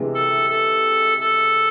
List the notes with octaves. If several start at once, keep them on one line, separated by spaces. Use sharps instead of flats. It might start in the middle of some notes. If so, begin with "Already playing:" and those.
Already playing: C3 E3 G#3
A4
A4
A4